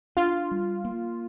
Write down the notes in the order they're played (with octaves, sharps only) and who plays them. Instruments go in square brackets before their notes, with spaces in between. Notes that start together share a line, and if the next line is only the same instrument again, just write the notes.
[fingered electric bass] D4 [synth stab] F4
[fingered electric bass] G3
A#3